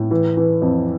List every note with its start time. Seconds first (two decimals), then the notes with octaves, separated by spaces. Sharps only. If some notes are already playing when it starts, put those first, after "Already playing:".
Already playing: A2
0.11 E3
0.37 E3
0.62 F2